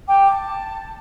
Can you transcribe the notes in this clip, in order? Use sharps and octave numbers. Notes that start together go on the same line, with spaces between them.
G5 D6
A5